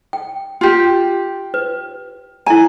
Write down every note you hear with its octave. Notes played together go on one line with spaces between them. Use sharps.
G5
F4 G4
B4
E4 G#5 A#5